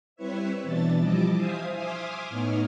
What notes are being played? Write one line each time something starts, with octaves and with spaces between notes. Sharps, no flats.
G3 C4 E4 B4 C#5 E5
B2 E3 D4 A6
F3 G3 E4 D#5 A5 D6
C5 E5 F5 G#5 D#6
E5 G#5 C6 D6 D#6 F6
A2 B3 D#4 C#5 F6